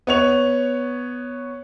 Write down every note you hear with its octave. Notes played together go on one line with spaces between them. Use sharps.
B3 C#5 F7